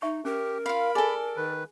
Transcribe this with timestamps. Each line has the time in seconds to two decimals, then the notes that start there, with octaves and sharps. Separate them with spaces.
0.02 D#4 E5 C#6
0.25 C#4 G4 A#4
0.66 F4 F5 B5
0.95 G#4 A4 D5 G#5
1.37 D#3 B4